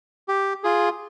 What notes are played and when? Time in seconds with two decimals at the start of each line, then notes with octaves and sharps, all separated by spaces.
0.28 G4
0.64 F4 G#4